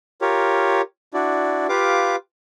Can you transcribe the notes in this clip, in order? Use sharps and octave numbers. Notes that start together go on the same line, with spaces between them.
F4 G4 A#4 C#5
D4 E4 F#4 D5
F4 G4 B4 F5 D6